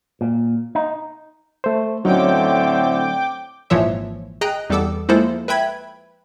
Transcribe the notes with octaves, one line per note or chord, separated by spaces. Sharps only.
A#2
D#4
A3 C5
A2 D3 F#3 C4 C#4 D#4 G5 D6
G#1 A#2 E3 F3 C#5 E5
G#4 D#5 G5 A#5 F#6
E2 G3 B3 A4 D6 E6
F3 G#3 A#3 E4 A4 C5
B4 E5 G5 B5 G#6